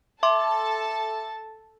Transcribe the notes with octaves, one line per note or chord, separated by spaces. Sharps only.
A4 E5 A5 C6 D6